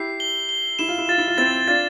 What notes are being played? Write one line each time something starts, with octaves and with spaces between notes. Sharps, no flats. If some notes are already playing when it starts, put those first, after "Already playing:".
Already playing: E4 G4 C7
G7
G7
E4 E7
F4
E4
F4 A6
E4
F4
C4 E4 A6
D4 F4 A6